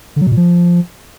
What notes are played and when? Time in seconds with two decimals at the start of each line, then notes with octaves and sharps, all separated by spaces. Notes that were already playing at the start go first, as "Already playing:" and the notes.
0.16 D3
0.21 F#3
0.27 B2
0.32 A#2
0.37 F3